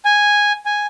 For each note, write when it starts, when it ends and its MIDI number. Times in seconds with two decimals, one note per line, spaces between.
0.05 0.53 80
0.66 0.87 80